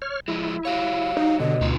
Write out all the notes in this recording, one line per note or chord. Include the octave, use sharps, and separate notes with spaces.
C#5 F6
F3 G#3 E4
F#4 G4 C#5 F5
D#4
B2 D3 D#5
D2 D#4 F4